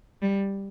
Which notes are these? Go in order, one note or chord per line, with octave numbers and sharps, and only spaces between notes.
G3